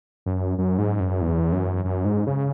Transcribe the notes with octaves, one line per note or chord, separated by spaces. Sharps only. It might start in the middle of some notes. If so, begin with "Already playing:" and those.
F#2
F#2
G#2
F#2
E2
F#2
F#2
G#2
C#3